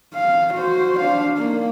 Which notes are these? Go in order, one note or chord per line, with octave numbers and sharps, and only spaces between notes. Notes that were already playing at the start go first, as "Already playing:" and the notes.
F5
F#4 C5
D4 F5
A#3 D#4